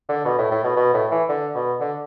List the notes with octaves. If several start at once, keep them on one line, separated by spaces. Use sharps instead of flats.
D3
B2
A2
A2
B2
B2
A2
E3
D3
B2
D3